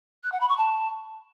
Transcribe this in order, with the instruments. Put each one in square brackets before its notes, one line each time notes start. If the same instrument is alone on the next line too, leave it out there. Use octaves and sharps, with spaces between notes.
[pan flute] F#6
F#5
B5
C#6
A5